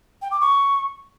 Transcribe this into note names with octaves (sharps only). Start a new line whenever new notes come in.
G5
D6
C#6